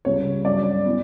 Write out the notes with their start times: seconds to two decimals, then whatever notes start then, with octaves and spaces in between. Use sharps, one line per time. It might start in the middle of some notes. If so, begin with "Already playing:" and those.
0.05 C#2 C#3 G3 C#5
0.45 G2 F#3 C#4 D5
0.85 E3 B3